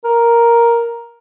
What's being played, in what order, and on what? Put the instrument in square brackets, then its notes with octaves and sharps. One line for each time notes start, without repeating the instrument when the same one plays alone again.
[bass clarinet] A#4